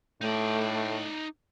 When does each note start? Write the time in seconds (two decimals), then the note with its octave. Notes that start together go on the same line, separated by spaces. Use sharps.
0.21 A2 A3 D#4 D5